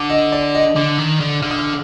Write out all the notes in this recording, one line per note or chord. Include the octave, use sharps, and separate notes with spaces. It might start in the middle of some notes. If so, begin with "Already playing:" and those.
Already playing: D3 D6
D#5
D5
D#5
D3 D6
D#3
D3
D3 F6
D#6
F6